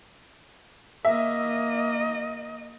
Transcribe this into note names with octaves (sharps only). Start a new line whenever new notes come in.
A#3 D#5 E5